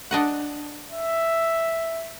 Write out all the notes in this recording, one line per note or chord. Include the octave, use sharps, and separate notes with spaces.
D4 D#5 F#5
E5